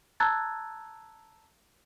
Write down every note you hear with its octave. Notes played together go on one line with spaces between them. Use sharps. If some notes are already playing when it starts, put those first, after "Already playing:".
A5 A#5 E6 F#6 G#6 A6